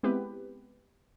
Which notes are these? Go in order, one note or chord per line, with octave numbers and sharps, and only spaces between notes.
G#3 B3 C4 E4 G4 B4